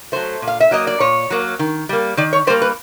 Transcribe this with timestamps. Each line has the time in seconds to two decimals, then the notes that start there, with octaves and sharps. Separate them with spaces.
0.12 F#3 A3 C5
0.42 A#2
0.47 F5
0.60 E5
0.71 F#3 A#3 D#5
0.87 D5
1.00 A#2 C#5
1.30 F#3 A#3
1.59 D#3
1.89 G3 A#3
2.17 D#3 D5
2.33 C#5
2.47 G3 C5
2.50 A#3
2.62 B4